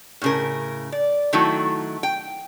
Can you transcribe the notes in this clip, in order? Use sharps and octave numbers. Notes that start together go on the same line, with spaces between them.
A2 C#3 A#4
D5
D#3 F#3 A3 E4
G5